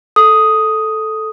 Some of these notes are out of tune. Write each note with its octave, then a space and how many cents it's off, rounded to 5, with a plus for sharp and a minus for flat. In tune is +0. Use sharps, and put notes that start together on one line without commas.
A4 -5 D#6 +5